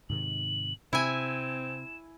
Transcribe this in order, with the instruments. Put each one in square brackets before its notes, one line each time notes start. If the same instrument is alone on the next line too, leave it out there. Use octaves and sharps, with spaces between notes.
[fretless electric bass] G#2 C3 D#3 [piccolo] F#7
[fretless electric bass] C3 [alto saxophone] C4 [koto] E4 G#5 [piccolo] E7